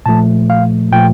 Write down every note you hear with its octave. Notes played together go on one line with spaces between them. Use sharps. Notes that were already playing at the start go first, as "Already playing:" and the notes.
A#2 F3 A3 A5
F5
A#2 F3 A3 G5